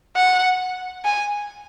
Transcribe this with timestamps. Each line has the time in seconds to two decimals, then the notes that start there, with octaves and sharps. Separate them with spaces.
0.16 F#5
1.05 G#5